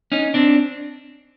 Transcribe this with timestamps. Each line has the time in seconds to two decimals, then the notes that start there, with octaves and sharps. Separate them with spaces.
0.12 C#4 D#4
0.34 C4 D4